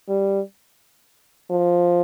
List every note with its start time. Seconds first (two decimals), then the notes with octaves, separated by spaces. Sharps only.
0.09 G3
1.50 F3